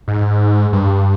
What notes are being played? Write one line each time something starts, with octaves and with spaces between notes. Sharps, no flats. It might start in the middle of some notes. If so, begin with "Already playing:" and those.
G#2
G2